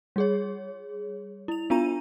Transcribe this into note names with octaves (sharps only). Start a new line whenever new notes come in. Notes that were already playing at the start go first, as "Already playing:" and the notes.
G3 G#4 C#5
E4 F7
B3 D4 F4 A#5 D#7